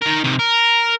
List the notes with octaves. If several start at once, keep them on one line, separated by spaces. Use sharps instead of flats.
D#3 A#4
C3 D#3
A#4